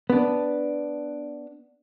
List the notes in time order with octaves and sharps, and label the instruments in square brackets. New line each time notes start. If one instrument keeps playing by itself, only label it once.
[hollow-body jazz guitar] B3 D4